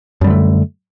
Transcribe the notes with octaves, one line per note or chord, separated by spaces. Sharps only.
F#2 D3 G3 A3